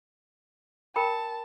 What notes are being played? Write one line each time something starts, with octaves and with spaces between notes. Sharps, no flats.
A#4 G5 A5 B5